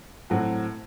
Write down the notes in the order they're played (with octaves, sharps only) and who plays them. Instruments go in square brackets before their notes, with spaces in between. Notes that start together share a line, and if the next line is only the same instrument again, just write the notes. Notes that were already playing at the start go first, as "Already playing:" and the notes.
[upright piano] A2 F#3 C4 F#4